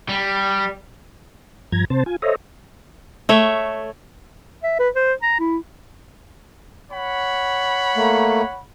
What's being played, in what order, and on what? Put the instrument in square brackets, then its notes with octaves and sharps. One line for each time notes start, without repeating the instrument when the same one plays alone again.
[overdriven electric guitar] G3
[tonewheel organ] G2 F3 A#5 G#6
C3 C4 C5 A5
F4 G#5
A4 C5 C#5 D#5 E5 A#5
[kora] A3 C#5 E5
[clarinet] E5
B4
C5
A#5
E4
[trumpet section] C#5 F#5 B5
[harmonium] A3 A#3